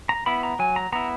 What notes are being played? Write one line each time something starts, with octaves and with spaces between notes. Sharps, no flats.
A#5
B3 E4 B5
A#5
F#3 G#5
A#5
B3 E4 A#5